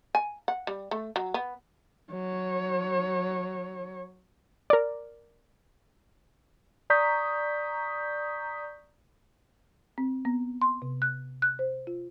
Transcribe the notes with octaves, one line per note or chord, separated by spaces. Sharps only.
G#5
F#5
G3
A3
F#3
B3
F#3 C#5
A#4 D5
D5 A#5 C#6 D#6 G6 B6
C4
B3
C6
C3
F#6
F#6
C5
F4